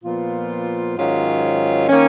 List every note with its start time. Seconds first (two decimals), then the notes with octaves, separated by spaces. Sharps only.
0.03 A#2 F3 B3 F4
0.96 G#2 D#3 F#3 C#4 F4
1.89 D#3 A#3 C#4